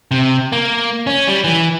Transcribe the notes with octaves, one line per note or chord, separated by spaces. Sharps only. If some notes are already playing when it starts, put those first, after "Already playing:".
C3
A#3
C#4
G3
E3